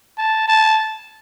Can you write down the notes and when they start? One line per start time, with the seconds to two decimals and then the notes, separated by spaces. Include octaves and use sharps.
0.18 A5
0.48 A5